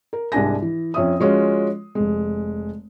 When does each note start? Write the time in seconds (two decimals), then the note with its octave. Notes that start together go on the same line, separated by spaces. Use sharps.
0.13 A#4
0.32 C2 G#2 D4 G#5 A#6
0.62 E3
0.94 F2 C#4 E5 D#6
1.20 F3 G#3 C#4 F4 F#4
1.95 F1 G#3